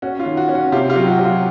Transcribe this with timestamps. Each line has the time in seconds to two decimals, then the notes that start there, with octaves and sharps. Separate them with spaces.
0.02 C#4 F#4
0.20 F4
0.26 D#3
0.37 F#4
0.49 C#4
0.55 F#4
0.72 C3 F4 G4
0.90 F4 G4
0.96 F#3
1.07 F#4
1.19 F#3
1.25 F4